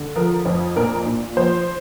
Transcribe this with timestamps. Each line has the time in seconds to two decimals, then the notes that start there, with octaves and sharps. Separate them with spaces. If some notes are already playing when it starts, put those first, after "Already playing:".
Already playing: D3
0.16 F3 A#4
0.45 F2
0.76 A#2 A#4
1.06 A#2
1.37 F3 C5